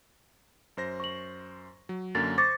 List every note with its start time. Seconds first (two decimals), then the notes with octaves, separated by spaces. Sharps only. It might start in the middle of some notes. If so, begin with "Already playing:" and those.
0.77 F#2 C5 A#6
1.00 C#6 F#7
1.89 F#3
2.15 F#2 D3 A#3 A6
2.38 C5 C#6 D6 A6 A#6